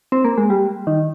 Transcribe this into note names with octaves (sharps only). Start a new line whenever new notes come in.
C4
A#3
G#3
G3
D#3